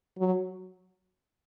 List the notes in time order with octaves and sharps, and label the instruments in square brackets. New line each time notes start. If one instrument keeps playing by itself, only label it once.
[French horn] F#3